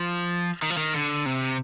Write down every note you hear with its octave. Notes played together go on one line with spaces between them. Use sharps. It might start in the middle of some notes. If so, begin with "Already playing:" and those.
Already playing: F3
D#3
F3
D#3
D3
C3